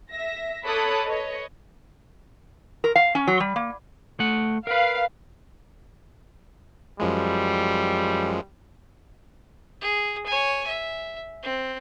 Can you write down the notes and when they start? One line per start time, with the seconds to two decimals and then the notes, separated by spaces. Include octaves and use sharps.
0.11 E5 A#6
0.64 A4 C#5 B5 D6 D#6 F#6
1.06 B4 C#5 D#5
2.84 A#4
2.96 F5
3.15 C#4
3.27 F#3
3.40 G3
3.56 A#3
4.20 A3 F#5
4.67 A#4 B4 F5
7.00 F#2 F3 G3 G#3
9.81 G#4
10.26 C#5 G#5
10.67 E5
11.43 C4